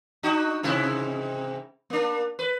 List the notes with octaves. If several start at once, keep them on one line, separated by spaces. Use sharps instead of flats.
D4 D#4 F#4
G#2 C3 E4
A#3 D4
B4